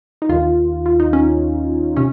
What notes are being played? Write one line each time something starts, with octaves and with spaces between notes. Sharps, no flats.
D#4
D#2 D#3 F4
F4
D#4
C#4
C3 C#4